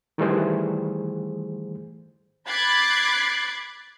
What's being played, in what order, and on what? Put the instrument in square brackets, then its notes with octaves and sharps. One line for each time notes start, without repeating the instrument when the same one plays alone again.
[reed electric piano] D#3 E3 G3 A3 G#4 C5
[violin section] B5 D6 F#6 G#6 A6 C7